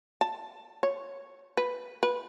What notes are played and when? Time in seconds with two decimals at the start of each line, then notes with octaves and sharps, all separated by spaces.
0.21 A5
0.83 C#5
1.57 B4
2.03 B4